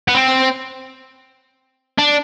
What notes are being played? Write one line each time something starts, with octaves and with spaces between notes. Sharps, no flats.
B3
C4
D4